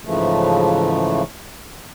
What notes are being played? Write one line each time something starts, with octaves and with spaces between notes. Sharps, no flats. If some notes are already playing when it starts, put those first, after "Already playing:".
G#2 C#3 E3 F3 A3